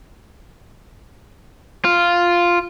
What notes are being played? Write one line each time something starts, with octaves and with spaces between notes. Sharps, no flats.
F4